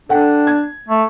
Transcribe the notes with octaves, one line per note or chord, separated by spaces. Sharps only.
D4 A4 F#5 G5
G#6
A3